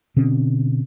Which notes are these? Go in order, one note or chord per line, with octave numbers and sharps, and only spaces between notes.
B2 D3 C4 C#4